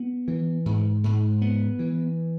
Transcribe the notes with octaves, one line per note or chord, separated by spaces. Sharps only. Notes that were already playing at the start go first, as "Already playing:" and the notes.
Already playing: B3
E3
G#2
G#2
B3
E3